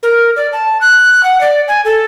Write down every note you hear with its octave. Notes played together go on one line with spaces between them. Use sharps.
A#4
D5
A5
F#6
F#5
D5
G#5
A4